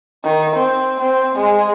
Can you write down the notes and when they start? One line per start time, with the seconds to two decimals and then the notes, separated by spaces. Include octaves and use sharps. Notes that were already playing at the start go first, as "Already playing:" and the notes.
0.24 D#3
0.56 C4
1.00 C4
1.35 G#3